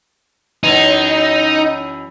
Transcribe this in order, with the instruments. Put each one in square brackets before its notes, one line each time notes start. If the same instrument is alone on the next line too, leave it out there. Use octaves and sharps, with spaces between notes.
[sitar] F#2 E3 [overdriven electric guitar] D#4